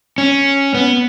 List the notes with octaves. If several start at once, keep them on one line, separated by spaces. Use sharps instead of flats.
C#4
B3